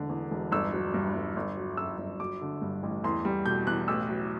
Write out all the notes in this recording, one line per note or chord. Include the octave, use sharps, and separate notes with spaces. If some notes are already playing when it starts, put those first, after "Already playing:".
Already playing: E1 D3
E2
E1
G1 E6
F#3
G2
G1
G1
F#3
F#2 E6
G1
F#3 D6
D3
G2
A1
E2 C6
G3
B2 G6
E2 F#6
A1 E6
F#3